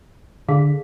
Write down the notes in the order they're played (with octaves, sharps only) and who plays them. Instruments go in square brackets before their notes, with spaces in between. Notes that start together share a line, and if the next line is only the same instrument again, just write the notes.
[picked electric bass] D3 [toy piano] G#4 F5